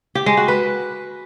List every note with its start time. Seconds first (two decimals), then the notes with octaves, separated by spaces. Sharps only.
0.15 G4
0.26 G#3
0.37 F#4
0.48 B4